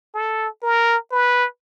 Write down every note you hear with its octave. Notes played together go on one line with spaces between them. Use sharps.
A4
A#4
B4